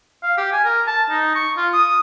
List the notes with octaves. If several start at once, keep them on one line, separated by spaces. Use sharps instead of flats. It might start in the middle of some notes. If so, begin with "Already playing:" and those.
F5
G4
G#5
A#4
A5
D#4
C#6
F4
D#6